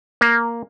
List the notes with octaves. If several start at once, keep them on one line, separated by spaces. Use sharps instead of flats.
A#3